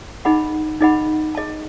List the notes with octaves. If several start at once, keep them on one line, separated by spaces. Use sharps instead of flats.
D#4 G#4 D#5 F#5 B5
D#4 G#4 D#5 F#5 B5
G#4 D#5 A5